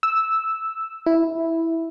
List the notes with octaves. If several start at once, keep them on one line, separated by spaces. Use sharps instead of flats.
E6
E4